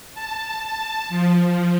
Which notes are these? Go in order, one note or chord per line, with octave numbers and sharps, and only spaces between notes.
A5
A5
F3